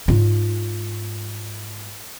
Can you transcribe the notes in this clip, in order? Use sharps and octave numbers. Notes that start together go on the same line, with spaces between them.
G#2 F4